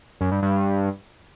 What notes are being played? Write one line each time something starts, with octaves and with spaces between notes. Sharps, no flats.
F#2
G2
G2